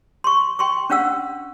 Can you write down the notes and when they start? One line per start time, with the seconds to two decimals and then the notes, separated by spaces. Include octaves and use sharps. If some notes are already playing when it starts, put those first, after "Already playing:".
0.24 C6 C#6
0.59 G5 C6 C#6
0.90 C#4 D4 F5 F#5 E6